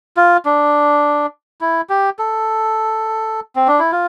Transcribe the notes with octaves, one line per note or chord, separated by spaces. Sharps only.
F4
D4
E4
G4
A4
C4
D4
E4
F4